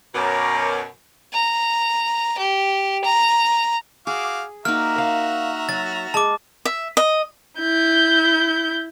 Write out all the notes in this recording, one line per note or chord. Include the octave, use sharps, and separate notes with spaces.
F#2 B2 A#4 C#5 A#5 D6
A#5
G4
A#5
F#4 G#4 F5 D6
A#3 D#4 F#4 E5 A#5 F6
A#4 F5
F#3 A6
G#3 A5 D6
E5
D#5
E4 G6